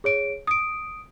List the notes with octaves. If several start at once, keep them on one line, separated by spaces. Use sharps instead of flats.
G#4 C#5 D7
D#6 D7